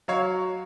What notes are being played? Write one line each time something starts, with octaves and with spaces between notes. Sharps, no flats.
F#3 C#5 F5